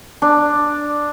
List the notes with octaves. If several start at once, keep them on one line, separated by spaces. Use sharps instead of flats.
D4